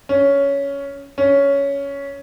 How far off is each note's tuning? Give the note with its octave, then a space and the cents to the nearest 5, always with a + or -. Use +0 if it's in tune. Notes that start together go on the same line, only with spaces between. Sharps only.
C#4 +10
C#4 +10